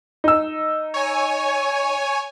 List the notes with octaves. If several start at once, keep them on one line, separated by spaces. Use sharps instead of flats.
D#4 E6
C#5 G#5